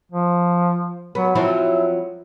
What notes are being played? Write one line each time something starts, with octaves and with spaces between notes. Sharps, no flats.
F3
F#3 B3
F3 F#3 C4 E4